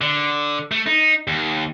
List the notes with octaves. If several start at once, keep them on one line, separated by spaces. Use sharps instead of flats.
D3
A3
D#4
D#2